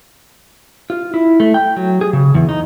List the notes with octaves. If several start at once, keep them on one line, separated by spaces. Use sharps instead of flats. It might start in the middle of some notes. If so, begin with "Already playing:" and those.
F4
E4
A3
G5
F#3
G#4
C#3
E2
D#4